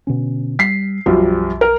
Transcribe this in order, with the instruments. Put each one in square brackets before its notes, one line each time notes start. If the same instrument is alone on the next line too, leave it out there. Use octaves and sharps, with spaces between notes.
[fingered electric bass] B2 D3 C#4
[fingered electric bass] G3 [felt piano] B6 C7
[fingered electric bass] B1 [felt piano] F#2 F3 G3
[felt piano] A#4